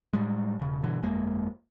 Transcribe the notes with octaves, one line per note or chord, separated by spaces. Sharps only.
A2 G3 G#3
E1 C#3
G2 B2 D3 E3
G1 F2 G#3 A#3